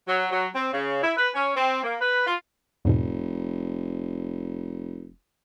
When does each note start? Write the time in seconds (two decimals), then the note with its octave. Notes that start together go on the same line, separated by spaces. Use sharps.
0.08 F#3
0.31 F#3
0.55 C4
0.73 C#3
1.03 E4
1.17 B4
1.34 C#4
1.56 C4
1.83 A#3
2.01 B4
2.27 F4
2.85 F1 E2 G#2 B2